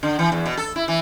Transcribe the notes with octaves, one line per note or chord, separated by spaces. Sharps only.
D3
E3
E2
B2
A4
E4
E3